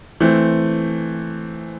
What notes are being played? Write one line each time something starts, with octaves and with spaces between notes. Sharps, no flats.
E3 A3 C4